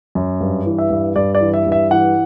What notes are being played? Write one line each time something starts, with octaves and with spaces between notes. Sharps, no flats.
F#2
G2
E3
E5
G2
G2 D5
D5
E3
E5
G2
E5
E3 F#5